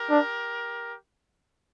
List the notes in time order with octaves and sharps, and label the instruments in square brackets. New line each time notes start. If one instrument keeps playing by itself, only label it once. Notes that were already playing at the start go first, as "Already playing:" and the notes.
Already playing: [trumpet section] G4 A#4
[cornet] D4